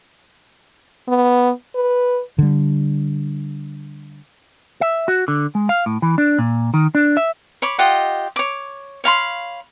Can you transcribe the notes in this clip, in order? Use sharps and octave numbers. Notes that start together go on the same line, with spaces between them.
B3
B4
D3 G3
E5
F#4
D3
G#3
F5
A2
E3
D4
A#2
D#3
D4
E5
C#5 B5 D6
F4 G4 D#5 F#5
C#5 D6
C#5 F5 B5 C6